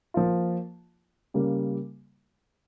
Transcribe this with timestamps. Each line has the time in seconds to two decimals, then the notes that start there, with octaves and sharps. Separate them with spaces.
0.14 F3 A#3 F4
1.34 C#3 G3 A#3